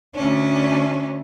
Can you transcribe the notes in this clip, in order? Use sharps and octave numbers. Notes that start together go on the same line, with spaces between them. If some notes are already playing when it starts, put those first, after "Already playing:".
D2 C#4 D4